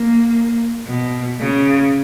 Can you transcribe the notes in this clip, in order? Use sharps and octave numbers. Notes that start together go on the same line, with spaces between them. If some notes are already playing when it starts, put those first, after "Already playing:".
Already playing: A#3
B2
C#3